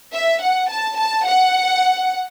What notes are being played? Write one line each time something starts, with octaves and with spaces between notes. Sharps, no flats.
E5
F#5
A5
A5
F#5